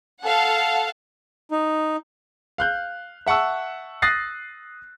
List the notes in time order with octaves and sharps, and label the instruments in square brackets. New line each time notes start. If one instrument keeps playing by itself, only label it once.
[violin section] A4 F5 F#5
[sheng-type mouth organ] D#4
[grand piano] F5 F#6 G6
E5 F#5 A5 C#6 E6
D#6 F#6 A6 A#6 C7